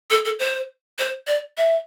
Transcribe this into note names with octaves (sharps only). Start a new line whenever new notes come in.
A4
A4
C5
C5
D5
E5